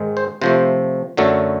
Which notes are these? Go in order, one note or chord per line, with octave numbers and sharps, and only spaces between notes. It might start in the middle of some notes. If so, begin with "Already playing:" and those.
Already playing: G#2 D#3 G#3
C5
C3 F3 A3 C5
F#2 D3 F#3 A3